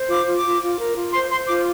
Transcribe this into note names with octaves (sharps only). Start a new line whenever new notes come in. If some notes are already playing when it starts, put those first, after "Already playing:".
Already playing: C5
F4 D6
F4
D6
F4
F4
A#4
F4
C5 C6
C5 C6
F4 D6